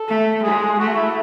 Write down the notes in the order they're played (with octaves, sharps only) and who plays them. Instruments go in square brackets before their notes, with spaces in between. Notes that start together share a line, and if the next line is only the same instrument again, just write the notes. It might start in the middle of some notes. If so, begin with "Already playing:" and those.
Already playing: [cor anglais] A4
[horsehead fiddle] A3
[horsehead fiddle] G#3 [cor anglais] G#4
[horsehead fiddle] A3 [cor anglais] F#4
[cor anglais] E4